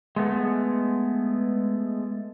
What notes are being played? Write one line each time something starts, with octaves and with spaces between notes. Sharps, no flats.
G#3 A3 B3